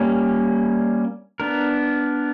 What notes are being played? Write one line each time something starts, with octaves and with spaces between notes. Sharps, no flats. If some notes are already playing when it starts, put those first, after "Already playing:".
Already playing: G3 A#3 C#4
B3 D4 A#4